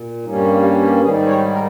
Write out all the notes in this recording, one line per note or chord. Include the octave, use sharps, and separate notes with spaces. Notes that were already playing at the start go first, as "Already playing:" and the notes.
Already playing: A#2
G2 G3 A#3 C#4 D#4
G4
G4
G#2 D#3 G3 G#4
C#5
A#4